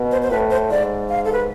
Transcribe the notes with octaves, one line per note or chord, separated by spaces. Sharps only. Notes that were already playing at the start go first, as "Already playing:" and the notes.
Already playing: B2
C5
C5
A2 B4
C5
G#2 D5
F5
A4
B4